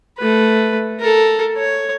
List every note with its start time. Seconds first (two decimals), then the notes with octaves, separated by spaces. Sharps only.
0.19 A3 B4
1.00 A4 A#4
1.57 C#5